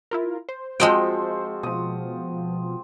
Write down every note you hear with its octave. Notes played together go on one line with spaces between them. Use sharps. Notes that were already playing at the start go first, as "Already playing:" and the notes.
E4 F4 A#4
C5
F3 G#3 C4 F#4 D#5 G5
B2 F3 D#6